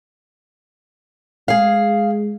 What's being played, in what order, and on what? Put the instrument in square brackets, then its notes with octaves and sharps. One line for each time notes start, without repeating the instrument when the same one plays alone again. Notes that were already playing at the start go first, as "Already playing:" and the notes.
[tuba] G#3 [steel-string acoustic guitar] G#4 F5